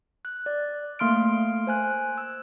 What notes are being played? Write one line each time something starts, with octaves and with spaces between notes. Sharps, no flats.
F#6
D5
A3 A#3 C6 F6 D7
C5 G#5 F#6
E6